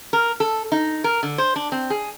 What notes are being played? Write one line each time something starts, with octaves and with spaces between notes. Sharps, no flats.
A#4
A4
D#4
A#4
D3
C5
D4
C4
G#4